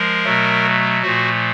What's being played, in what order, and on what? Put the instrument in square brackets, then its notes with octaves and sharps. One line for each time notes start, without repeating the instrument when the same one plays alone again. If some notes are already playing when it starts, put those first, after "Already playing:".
Already playing: [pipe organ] F3 G#3 A#4
B2 F#3 A3
A#2 F3 A3 F#4